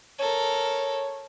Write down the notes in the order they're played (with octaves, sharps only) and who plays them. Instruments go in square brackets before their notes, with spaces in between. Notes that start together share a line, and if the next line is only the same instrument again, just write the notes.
[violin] A4 A#4 [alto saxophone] C#5